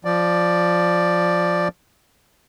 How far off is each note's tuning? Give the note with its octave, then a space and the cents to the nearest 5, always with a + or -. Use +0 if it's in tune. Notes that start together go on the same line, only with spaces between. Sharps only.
F3 +0 D5 +5